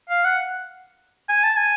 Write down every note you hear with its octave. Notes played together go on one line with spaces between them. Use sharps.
F5
F#5
G#5
A5
G#5